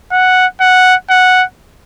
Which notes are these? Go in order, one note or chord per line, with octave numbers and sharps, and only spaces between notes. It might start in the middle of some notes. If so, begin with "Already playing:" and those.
F#5
F#5
F#5